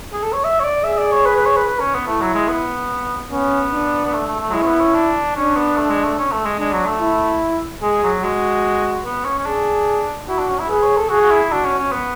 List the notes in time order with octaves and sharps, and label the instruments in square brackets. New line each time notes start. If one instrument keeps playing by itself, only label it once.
[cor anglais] G#4
A4
C#5
E5
C#5
D5
[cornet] G#4 [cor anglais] E5
[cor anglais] D5
C#5
B4
B4
C#5
B4
B4
C#4
B3
[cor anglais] A3 [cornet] E4
[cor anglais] F#3
G#3
B3
[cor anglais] B3 [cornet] C#4
[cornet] D4
[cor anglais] B3
A3
A3
A3
F#3
[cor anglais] G#3 [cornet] E4
[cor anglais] C#4
B3
C#4
D4
[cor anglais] C#4 [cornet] D4
[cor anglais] B3
A3
G#3
A3
C#4
A3
G#3
[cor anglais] G#3 [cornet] D4
[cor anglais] F#3
A3
[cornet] E4
[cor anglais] G#3 [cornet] G#4
[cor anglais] F#3
[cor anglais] G#3 [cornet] F#4
[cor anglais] B3
C#4
C#4
[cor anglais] D4 [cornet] G#4
[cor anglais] E4 [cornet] F#4
[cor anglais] D4
C#4
E4
[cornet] G#4 [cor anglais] B4
[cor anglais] C#5
A4
[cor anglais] F#4 [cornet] G#4
[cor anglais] F#4
E4
[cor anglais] D4 [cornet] F#4
[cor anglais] C#4
C#4
B3